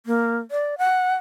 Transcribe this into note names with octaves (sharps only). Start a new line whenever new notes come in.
A#3
D5
F#5